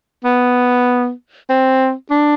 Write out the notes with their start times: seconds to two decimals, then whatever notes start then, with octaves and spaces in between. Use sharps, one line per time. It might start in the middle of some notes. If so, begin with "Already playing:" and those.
0.24 B3
1.49 C4
2.11 D4